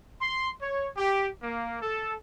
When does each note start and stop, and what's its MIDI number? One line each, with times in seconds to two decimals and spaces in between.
0.21 0.49 84
0.60 0.87 73
0.97 1.27 67
1.41 1.81 58
1.81 2.14 69